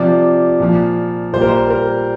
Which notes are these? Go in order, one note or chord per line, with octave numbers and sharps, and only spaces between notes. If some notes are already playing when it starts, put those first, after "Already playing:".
Already playing: C3 F3 D5
A#2 F3
A#2 G3 C5
A#4
C5
A#4